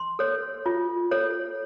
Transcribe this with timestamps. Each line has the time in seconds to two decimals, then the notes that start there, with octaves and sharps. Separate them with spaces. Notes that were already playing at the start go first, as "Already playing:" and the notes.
Already playing: C6
0.19 A4 C#5
0.66 F4
1.11 A4 C#5